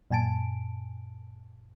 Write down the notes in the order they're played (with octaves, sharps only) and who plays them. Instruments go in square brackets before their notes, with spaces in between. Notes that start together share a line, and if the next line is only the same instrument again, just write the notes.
[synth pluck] F#2 A#2 G#5 A5 D7